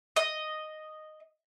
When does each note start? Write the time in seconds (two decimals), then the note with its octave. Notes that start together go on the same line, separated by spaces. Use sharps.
0.16 D#5